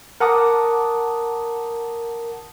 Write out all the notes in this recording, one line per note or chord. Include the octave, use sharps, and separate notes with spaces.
A#4 F#5 A5 D6 D#6